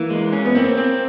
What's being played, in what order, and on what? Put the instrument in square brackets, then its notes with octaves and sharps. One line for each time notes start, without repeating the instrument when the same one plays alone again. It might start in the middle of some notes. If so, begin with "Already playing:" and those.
Already playing: [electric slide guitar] E3 [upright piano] A#3
[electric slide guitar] G#3
C#4
[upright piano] B3
[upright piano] A#3 [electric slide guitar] C4
[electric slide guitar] C4